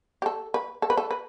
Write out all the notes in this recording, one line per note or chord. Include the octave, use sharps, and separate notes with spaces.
G4
A4
B4
A4
B4
A4
B4